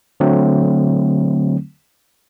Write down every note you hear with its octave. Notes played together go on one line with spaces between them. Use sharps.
D3 F#3 A3 C4